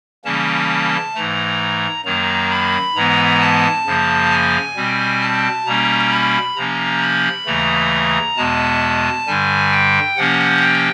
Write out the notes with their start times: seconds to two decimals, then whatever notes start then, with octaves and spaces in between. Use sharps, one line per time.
0.24 C#3 E3 G3 A#3 C#4 A5
1.14 G#2 E3 A3 A#5
2.05 F#2 D#3 F#3 A#3 A#5
2.51 B5
2.95 G#2 E3 G#3 B3 A#5
3.40 A5
3.86 F#2 C#3 F3 A#3
4.30 G#5
4.76 B2 G3 C4
5.21 A5
5.65 B2 G3 A#3 C#4 A#5
6.11 B5
6.56 C3 F3 A#3 C#4 A#5
7.02 B5
7.46 D#2 C#3 E3 A3 A#5
8.37 E2 B2 G#3 B3 A5
9.27 G2 D3 G3 G#5
9.72 G5
10.17 C3 F3 A#3 C#4 F#5
10.62 G5